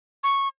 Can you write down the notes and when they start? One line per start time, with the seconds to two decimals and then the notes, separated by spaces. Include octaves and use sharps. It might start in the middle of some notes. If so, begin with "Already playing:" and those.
0.24 C#6